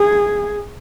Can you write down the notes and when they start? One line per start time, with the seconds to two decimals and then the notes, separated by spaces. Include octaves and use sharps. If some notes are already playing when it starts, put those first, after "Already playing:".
Already playing: G#4